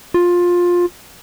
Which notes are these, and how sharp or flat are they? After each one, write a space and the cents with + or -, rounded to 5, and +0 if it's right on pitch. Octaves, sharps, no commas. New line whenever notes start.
F4 +15